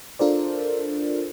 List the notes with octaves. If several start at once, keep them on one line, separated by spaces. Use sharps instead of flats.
D4 F4 A4 A#4 C5 D5